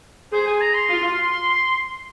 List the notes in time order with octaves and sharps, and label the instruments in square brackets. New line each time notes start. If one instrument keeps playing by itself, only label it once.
[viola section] G#4 [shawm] C5
[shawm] G#5
A#5
C6
[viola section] F4